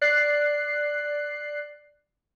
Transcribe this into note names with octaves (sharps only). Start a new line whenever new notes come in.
D5 F#6 C7